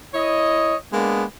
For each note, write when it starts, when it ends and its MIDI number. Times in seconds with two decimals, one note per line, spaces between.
0.14 0.75 64
0.14 0.75 73
0.14 0.75 75
0.92 1.24 56
0.92 1.24 58
0.92 1.24 59
0.92 1.24 62